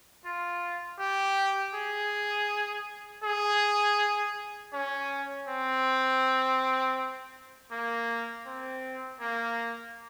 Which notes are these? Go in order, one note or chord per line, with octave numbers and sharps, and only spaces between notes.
F4
G4
G#4
G#4
C#4
C4
A#3
C4
A#3